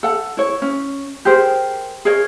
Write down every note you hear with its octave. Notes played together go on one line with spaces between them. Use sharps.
A4 F#5
E4 C#5
C#4
G4 G#4 A#4 C5
G#4 A#4 C#5 D#5